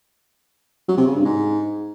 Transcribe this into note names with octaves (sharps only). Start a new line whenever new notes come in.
F#3
C3
C#3
G2
G#2